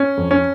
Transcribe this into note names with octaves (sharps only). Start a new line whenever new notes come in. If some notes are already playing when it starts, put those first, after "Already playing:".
Already playing: C#4
F2
C#4